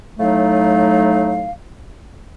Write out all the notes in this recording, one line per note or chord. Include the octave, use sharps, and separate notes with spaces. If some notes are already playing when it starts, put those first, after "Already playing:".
A2 F#3 A3 D#4 F5